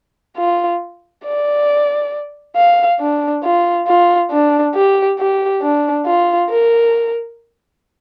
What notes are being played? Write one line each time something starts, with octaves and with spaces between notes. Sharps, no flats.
F4
D5
F5
D4
F4
F4
D4
G4
G4
D4
F4
A#4